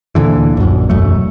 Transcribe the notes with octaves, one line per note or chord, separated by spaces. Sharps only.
D2 A#2 D3 E3
A#1 F#2
E1 F#2 A3